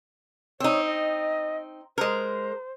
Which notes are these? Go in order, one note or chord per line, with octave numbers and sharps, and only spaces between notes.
C4 D#4 C#5
D#5
G#3 A#4 C5